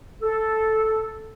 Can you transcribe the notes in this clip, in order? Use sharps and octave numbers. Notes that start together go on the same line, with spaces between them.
A4